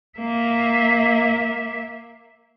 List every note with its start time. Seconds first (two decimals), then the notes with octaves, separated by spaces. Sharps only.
0.19 A#3 E5